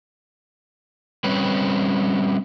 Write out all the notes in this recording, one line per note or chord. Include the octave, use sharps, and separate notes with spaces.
G3 C4 C#4 B4